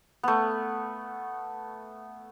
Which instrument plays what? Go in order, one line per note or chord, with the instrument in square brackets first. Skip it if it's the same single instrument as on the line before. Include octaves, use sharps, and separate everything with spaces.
[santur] A3 B3